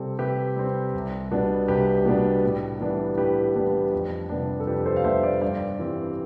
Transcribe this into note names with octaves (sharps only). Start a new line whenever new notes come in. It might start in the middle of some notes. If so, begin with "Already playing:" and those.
Already playing: C3 G3 C4 A4
C3 G4 B4
G3 C4
C2
B2 G3 B3 D4
C2 G4 B4
B2 G3 B3 D4
A2
E3 G3 B3 D4
A2 G4 B4
E3 G3 B3 D4
F2
C3 G3 B3 D4
A4
F2 G4 B4
A4 C5
F5
C3 G3 B3 D4 C5 E5
D5 F5
G2 D5 F5
E3 G3 C4